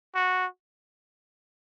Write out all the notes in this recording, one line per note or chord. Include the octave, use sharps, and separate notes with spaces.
F#4